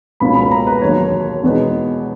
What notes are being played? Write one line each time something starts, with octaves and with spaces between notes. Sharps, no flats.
C#2 B2 A#3 C#4 B5
B5
A#5
B4
E1 D#2 D#3 F#3 C#5
E2 B2 G#3 B3 D#4